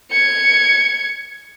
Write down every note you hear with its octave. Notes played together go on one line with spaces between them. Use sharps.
G#6 C#7